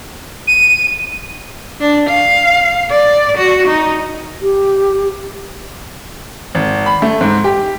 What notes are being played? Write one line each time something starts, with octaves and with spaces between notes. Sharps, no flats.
D#7
D4
F5
D5
F#4
D#4
G4
G#1
B5
A3
G#2
G4